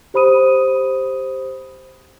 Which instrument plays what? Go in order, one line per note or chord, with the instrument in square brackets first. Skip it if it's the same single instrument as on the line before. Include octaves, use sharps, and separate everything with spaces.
[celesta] G4 C5 B5 D#6 D#7